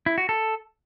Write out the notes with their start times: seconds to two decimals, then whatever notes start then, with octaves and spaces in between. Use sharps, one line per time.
0.06 E4
0.18 F#4
0.29 A4